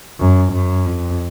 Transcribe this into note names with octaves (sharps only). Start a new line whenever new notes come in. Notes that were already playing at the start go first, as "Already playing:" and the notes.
F#2
F#2
F2